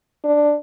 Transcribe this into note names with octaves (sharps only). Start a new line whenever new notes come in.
D4